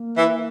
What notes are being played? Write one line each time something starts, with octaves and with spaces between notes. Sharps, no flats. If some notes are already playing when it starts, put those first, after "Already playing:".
Already playing: A#3
E3